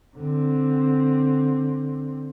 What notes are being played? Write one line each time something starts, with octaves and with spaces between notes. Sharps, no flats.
D3 C4